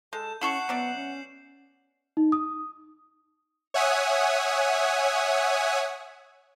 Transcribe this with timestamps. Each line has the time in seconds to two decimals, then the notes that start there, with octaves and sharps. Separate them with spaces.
0.13 G#3 A4 A5 G6
0.41 C#4 E4 A4 F#5 C#6 C7 E7 F#7
0.69 F#3 B3 D5 E5
0.95 C#4
2.17 D#4
2.32 D#6
3.74 C#5 E5 F#5 G#5 D#6